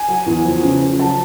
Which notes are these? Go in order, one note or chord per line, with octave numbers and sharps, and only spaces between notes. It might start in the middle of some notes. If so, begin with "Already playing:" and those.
Already playing: G#5
F#3
E2
F3
C#3
F3
F#3 A5